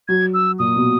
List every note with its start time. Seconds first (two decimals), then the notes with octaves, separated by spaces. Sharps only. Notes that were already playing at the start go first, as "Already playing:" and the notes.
0.08 F#3 G#6
0.34 E6
0.59 A#2 D#6
0.76 B2